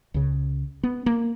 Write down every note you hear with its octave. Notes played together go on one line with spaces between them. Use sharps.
C#2 C#3
B3
A#3